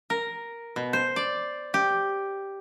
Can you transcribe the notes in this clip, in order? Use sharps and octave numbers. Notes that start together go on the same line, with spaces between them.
A#4
B2
C5
D5
G4